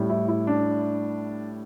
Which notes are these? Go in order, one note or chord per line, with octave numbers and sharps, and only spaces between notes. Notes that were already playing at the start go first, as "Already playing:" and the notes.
Already playing: A2 G3
E4
E4
D4